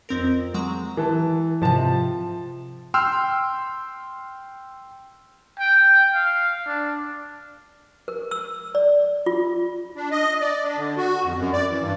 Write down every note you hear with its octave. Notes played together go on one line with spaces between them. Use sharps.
F2 C4 A#4
F#3 G#3 A#5
E3 A5
G#2 C3 F3 A5
G5 C6 E6 F6
G5
F5
D4
A#4
E6
D5
F4
D4
D#5
D5
D4
D3
F#4
F2
F#2
D5
E3
G2